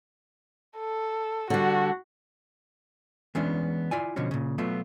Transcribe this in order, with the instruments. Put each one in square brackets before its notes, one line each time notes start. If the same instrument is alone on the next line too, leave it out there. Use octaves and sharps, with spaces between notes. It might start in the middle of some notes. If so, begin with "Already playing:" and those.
[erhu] A4
[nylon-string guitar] D3 G3 [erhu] F#4
[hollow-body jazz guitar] E3 G#3 B3 C#4 D4
E4 F4 D5 G#5
B2 D3 F3 C#4 F#4
A#2 C#3
B2 F#3 A3 B3 F4